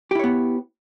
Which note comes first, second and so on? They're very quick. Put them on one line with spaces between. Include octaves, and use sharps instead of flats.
G4 E4 C#5 B3